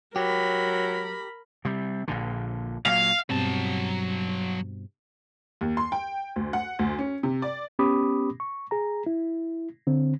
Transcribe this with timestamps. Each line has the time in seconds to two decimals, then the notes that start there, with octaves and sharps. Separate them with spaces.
0.16 F#3 G4 A#4 B5
1.65 C3 G3
2.08 A#1 A#2 D3
2.86 A#2 F#3 F5
3.30 G2 B2 F#3 C4 A5
5.61 D#2
5.77 C6
5.92 G5
6.36 D2
6.53 F#5
6.79 D2
6.99 C#4
7.23 C3
7.42 D5
7.79 B3 C#4 G4 B5 D6 D#6
8.40 C#6
8.71 G#4 A#5
9.06 E4
9.87 D3 C4